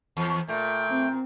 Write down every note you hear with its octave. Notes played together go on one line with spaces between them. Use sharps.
E2
A#2 A3 G5
C4